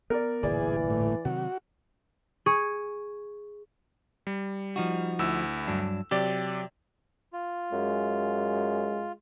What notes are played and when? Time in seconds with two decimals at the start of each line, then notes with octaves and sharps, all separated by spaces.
0.10 B3 A#4 D5
0.43 D1 G1 A#2 E3 G#4 D5
0.90 A2
1.25 C3 D#3 F#3 F#4
2.46 G#4 C#6
4.27 G3
4.76 F3 D#4 F#4
5.19 D2 E4 E6
5.68 G2 F#3 D4
6.11 C3 F#3 G4 D5
7.33 F4
7.73 F#2 G#3